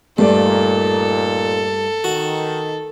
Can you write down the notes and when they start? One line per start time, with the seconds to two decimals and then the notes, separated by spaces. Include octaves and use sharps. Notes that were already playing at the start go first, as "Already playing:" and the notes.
0.18 G2 A#2 A3 D#4 A4 D5
2.04 D#3 F#4